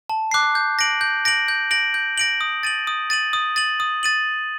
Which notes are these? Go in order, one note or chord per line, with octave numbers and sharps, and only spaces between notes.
A5
D6 F#6 C7
G6
A#6 D7 F#7
G6
A#6 D7 F#7
G6
A#6 D7 F#7
G6
A#6 D7 F#7
D#6
A6 D#7 F#7
D#6
A6 D#7 F#7
D#6
A6 D#7 F#7
D#6
A6 D#7 F#7